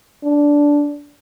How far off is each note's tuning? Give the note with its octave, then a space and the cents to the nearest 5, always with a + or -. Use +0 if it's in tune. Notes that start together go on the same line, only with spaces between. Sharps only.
D4 -10